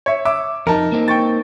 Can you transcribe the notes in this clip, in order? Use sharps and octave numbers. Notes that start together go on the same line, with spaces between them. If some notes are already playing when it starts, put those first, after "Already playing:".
C#5 E5
E5 D6 E6
F2 D#4 A#4 A5
A#3 C4 D#4
G5 C#6 A6